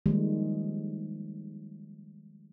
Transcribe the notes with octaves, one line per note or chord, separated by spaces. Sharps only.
D#3 F3 G3 G#3 A#3